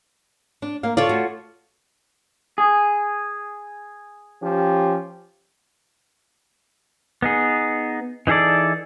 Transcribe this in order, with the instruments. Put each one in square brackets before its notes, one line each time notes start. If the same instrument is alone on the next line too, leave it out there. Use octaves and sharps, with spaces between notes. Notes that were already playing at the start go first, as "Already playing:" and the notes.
[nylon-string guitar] D4
A#3 F5
[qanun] F4 A4 C#5 [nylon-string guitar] D5
[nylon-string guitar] A3 F#4
[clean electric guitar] G#4
[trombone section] F3 C#4 G4
[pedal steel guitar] B3 D#4 G#4
E3 D#4 G#4 A4 D5